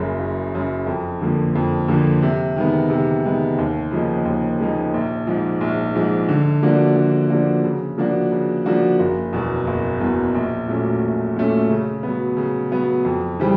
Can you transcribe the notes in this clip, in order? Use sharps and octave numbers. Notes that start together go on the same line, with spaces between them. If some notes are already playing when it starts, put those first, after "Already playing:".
Already playing: F#1 F#2 C#3
F#1
F#2 C#3
F2
D3 F3 A#3
F2
D3 F3 A#3
C3
D#3 G#3 B3
C3
D#3 G#3 B3
D#2
C#3 F3 A#3 D#4
D#2
C#3 F3 A#3 D#4
A#1
G#2 F3 G#3
A#1
G#2 F3 G#3
D3
F3 A#3 D4 F#4
D3
F3 A#3 D4 F#4
C#3
F3 A#3 D4 F#4
C#3
F3 A#3 D4 F#4
F#1
E2 B2 F#3
F#1
E2 B2 F#3
A#1
A#2 F#3 A3 C#4
A#1
A#2 F#3 A3 C#4
C#3
F#3 B3
C#3
F#3 B3
F2
C#3 E3 G3 C4